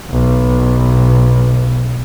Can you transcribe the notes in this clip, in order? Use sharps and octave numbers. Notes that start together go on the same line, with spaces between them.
B1 B2